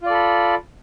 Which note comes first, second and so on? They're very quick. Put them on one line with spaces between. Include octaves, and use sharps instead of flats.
F4 D5 A4 B5